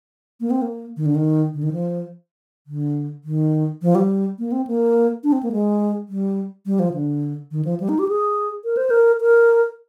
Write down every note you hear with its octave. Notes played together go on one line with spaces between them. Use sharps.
A#3
C4
A#3
D#3
D3
D#3
D3
D#3
F3
D3
D#3
F3
G3
A#3
C4
A#3
D4
C4
A#3
G#3
G3
G3
F3
D3
D#3
F3
G3
D#4
G4
G#4
A#4
C5
A#4
A#4